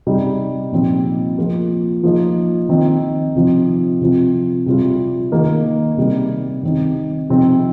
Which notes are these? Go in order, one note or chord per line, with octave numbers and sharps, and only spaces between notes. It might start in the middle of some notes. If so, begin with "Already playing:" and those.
C3 G3 D#4
A#2 F3 C4 D#4
F3 A#3 F4
F3 A#3 D#4
D#3 C4 D#4
C3 F3 C4 D#4
C3 F3 C4 F4
C3 G3 C4 F4
D#3 A#3 D#4
C3 G3 D#4
D#3 C4 D#4
C3 F3 C4 D#4